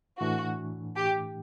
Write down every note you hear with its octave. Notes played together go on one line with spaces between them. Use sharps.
A2 E3 A3 D4 F#4
G4